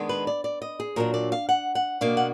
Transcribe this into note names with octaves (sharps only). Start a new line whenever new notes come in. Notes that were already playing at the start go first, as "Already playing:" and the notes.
Already playing: D#3 G#3 B3 D4
B4
D5
D5
D#5
G#4
A#2 F#3 D4 A#4
D5
F5
F#5
F#5
B2 A#3 D4 F5
F#5